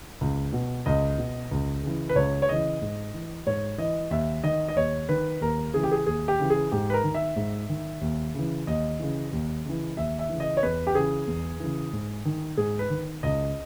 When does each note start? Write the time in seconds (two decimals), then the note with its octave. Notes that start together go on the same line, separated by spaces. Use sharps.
0.21 C#2
0.53 B2
0.86 C#2 D#5
1.18 B2
1.51 C#2
1.83 C#3 E3
2.09 B4
2.15 C#2 C#5
2.42 C#5
2.49 C#3 E3 D#5
2.82 G#2
3.14 E3
3.46 G#2 C#5
3.78 E3 D#5
4.11 D#2 E5
4.44 D#3 D#5
4.68 D#5
4.76 D#2 C#5
5.09 D#3 B4
5.41 D#2 A#4
5.73 C#3 E3 G#4
5.83 G4
5.91 G#4
6.07 D#2 G#4
6.28 G4
6.39 C#3 E3
6.50 G#4
6.72 G#2 G4
6.90 B4
6.94 A#4
7.04 D#3
7.15 E5
7.36 G#2
7.69 D#3
8.01 D#2
8.34 C#3 E3
8.67 D#2 D#5
9.00 C#3 E3
9.33 D#2
9.65 C#3 E3
9.97 D#2 E5
10.19 E5
10.29 C#3 E3
10.40 D#5
10.57 C#5
10.63 E2 B4
10.87 G4
10.95 C#3 E3 G#4
11.27 E2
11.60 C#3 E3
11.93 G#2
12.25 D#3
12.57 G#2 G#4
12.79 B4
12.90 D#3
13.23 C#2 D#5